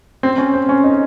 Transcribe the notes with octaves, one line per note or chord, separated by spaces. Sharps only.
C4
C#4
C4
C#4
D#4